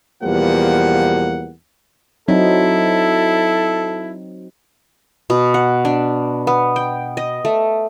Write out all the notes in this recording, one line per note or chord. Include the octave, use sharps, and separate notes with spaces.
E2 B2 F3 G3 A#3 F#5
F#3 C4 D#4 E4 A4
B2
F#5
D4
B3
G5
D#5
A3